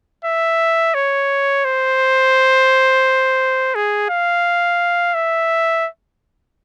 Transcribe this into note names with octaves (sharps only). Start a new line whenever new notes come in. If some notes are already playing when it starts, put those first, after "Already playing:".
E5
C#5
C5
G#4
F5
E5